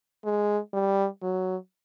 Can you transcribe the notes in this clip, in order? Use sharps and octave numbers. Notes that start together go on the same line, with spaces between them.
G#3
G3
F#3